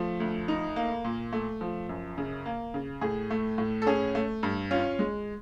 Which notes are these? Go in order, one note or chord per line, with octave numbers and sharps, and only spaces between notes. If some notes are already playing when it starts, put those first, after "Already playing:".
Already playing: F3 A3
D2
D#4
A#3
A#2
A3
F3
F#2
C#3
A#3
C#3
A2 G#4
A3
A2
A4
C#4 G#4
A3
G2
C#4 F4
G#3